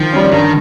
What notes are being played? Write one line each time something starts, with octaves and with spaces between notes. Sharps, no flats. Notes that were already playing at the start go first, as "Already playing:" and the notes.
Already playing: D#3 F3
G3 C#4
G2 D#3